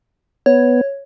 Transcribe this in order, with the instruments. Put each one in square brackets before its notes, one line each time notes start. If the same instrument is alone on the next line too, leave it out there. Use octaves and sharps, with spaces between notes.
[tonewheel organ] B3 [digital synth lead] C#5